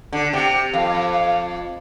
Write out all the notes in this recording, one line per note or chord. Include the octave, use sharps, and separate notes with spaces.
D3
C3 G5
F2 F5
F5